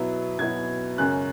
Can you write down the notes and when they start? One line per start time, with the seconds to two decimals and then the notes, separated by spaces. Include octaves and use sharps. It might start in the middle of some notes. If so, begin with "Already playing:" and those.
Already playing: B2 F#3 B3 E4
0.38 B2 F#3 B3 E4 G#6
0.98 F#2 C#3 G#3 C#4 F#6